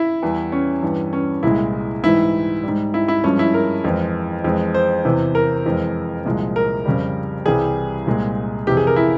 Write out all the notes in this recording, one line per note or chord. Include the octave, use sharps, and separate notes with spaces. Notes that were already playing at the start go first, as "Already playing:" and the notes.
Already playing: E4
E2 E3 G3
C#4
G2 E3 G3
C#4
C2 A#2 G#3 E4
G#2 E3 G3 E4
G#2 G3
E4
E4
G2 F3 G#3 C#4
E4
A#4
F2 E3 G#3
F2 E3 G#3
C5
E2 C3 E3
A#4
F2 E3 G#3
C2 A#2 F3 G#3
A#4
F2 C#3 G3
C2 C3 E3 G3 G#4
C2 A#2 G#3
F2 C3 E3 G4
G#4
A#4
E4